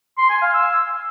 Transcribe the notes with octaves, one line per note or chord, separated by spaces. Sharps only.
C6
G#5
F5
E6